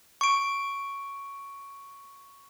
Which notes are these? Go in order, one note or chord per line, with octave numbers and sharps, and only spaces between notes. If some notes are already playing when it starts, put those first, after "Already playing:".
C#6 D7